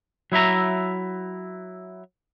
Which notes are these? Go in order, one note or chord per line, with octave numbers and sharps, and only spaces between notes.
F#3 E4 E5 A#5